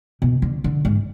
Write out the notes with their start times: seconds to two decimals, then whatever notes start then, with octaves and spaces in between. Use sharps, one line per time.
0.22 B2
0.42 D3
0.64 D3
0.85 G#2